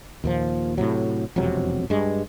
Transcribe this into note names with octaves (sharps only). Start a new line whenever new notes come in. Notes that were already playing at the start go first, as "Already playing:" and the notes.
D#2 A#2 F3
A2 C3 F#3
E1 F2 C3 F#3
G2 G#3